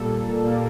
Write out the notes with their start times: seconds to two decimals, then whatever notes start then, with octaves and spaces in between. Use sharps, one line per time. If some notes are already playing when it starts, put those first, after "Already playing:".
Already playing: A#2 G3 A#3 A4
0.42 A#2 G3 A#3